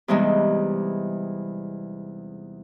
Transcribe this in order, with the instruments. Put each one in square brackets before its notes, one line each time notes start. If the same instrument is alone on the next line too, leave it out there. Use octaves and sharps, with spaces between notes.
[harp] E2 C3 E3 G3 G#3 D#4